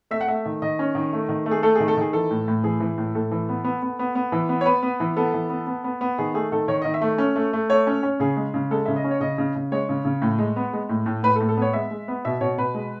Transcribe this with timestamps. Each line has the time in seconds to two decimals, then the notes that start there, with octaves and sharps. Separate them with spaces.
0.11 A3 E5
0.21 F#5
0.28 A3 E5
0.45 D#3
0.62 D#3 D#5
0.79 C#4
0.95 D#3
1.13 A3
1.29 D#3
1.46 A3
1.51 G#4
1.63 A3 A4
1.76 G#4
1.80 D#3
1.88 A4
1.97 D#3 G#4
2.13 E3 A4
2.30 A2
2.48 A2
2.64 E3 G#4
2.80 E3
2.98 A2
3.15 A2 A4
3.31 E3
3.49 B3
3.64 B3
3.82 B3
3.99 B3
4.15 B3
4.32 E3
4.49 B3
4.61 C#5
4.66 B3 B4
4.83 B3
5.00 E3
5.17 B3 A4
5.34 E3
5.50 B3
5.67 B3
5.84 B3
6.01 B3
6.18 D#3 G#4
6.34 A3 G#4
6.52 D#3 A4
6.68 D#3 C#5
6.82 D#3 D#5
6.94 E5
7.01 A3
7.18 C#4
7.36 A3
7.53 A3
7.70 A3 C#5
7.87 C#4
8.03 C#4
8.20 C#3 G#4
8.37 G#3
8.54 C#3
8.71 G#3 A4
8.86 C#3 E5
8.96 D#5
9.04 C#4
9.11 C#5
9.21 C#3 D#5
9.38 C#3
9.55 C#3
9.72 G#3 C#5
9.89 C#3
10.05 C#3
10.22 A2
10.38 G#3
10.56 B3
10.73 G#3
10.89 A2
11.06 A2
11.23 A2 B4
11.36 A4
11.40 A2
11.49 A4
11.57 B3 C#5
11.74 G#3 E5
11.91 G#3
12.08 B3
12.25 B2 E5
12.41 B2 C#5
12.58 B2 B4
12.74 G#3